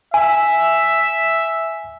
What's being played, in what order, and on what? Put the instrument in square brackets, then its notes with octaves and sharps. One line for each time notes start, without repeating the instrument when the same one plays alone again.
[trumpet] E5 [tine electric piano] G#5